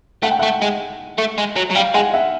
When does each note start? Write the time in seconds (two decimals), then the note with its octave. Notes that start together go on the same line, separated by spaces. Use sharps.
0.23 A3 F#5
0.31 G5
0.39 A3 E5 F#5
0.62 G#3
1.18 A3
1.38 G#3
1.56 F#3
1.71 F#3
1.75 G3 F5 G5
1.94 G#3 F#5 G#5
2.13 E5 F#5